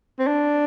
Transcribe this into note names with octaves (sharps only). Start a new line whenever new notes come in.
C4
D4